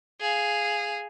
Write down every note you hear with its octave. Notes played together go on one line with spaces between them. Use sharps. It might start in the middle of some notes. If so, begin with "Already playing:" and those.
G#4 F5